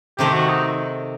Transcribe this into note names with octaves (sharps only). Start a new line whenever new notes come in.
C3 D#3 A3 C4 G4
F#4
D#4